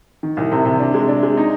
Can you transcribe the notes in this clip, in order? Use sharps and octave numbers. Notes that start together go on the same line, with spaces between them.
D#3
C2
C3
C3
D4
G#3
D4
G#3
D#4